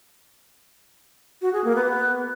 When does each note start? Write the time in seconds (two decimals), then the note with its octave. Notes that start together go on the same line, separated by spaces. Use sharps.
1.42 F#4
1.53 G#4
1.64 A#3
1.76 B3